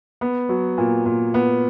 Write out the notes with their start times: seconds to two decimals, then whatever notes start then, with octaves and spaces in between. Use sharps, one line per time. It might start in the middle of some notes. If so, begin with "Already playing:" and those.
0.21 B3
0.49 F#3
0.78 A#2
1.05 A#2
1.34 B3